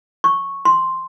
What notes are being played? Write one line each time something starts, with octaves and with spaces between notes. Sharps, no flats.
C#6
C6